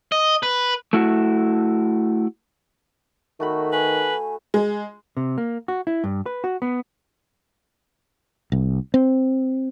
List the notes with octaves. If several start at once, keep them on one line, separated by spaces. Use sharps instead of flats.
D#5
B4
A3 E4 F#4
D#3 A3 F#4 B5
B4 G#5
G#3
C3
A#3
F#4
E4
G2
B4
F#4
B3
C2
C4